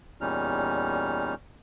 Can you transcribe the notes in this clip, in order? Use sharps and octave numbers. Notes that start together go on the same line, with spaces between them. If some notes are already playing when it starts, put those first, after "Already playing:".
E2 A#2 G3 C#4 D#4 F6